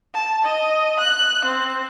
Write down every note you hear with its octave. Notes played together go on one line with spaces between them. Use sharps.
A5
D#5
F#6
C4